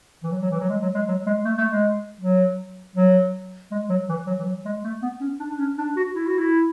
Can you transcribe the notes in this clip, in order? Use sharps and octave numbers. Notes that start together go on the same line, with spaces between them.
E3
F#3
F#3
E3
F#3
G#3
F#3
G#3
F#3
G#3
A3
A3
G#3
F#3
F#3
G#3
F#3
E3
F#3
E3
F#3
G#3
A3
B3
C#4
D4
D4
C#4
D4
F#4
E4
F#4
E4